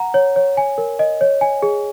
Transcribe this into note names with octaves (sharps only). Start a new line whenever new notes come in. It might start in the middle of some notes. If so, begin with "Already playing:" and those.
Already playing: F#5 A#5
C#5
C#5
G#5
A#4
D#5
C#5
G#5
G#4